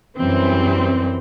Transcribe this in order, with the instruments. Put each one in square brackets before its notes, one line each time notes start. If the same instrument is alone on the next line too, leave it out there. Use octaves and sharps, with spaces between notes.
[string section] F#2 E3 G3 C4